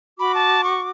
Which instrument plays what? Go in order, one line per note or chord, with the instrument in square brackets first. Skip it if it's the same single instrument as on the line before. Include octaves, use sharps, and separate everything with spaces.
[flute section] F#4 D6 [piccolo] B5
[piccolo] A5
C#6